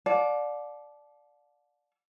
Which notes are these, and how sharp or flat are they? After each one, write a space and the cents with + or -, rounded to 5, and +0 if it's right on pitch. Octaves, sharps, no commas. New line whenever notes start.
D5 +0 F5 +45 A5 -25